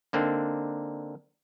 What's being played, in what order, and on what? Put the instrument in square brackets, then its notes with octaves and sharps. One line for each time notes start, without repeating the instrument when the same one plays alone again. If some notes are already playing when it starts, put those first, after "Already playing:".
[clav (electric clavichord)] D3 A#3 C4 D4 D#4